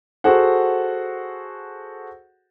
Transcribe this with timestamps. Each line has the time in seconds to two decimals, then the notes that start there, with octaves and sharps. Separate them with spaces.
0.24 F#4 G#4 A4 C5 F#5